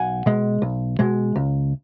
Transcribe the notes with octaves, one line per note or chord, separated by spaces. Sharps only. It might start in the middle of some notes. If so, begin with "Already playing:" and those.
Already playing: B1 F#5 G#5
B2 G#3
B1
B2 G#3
C#2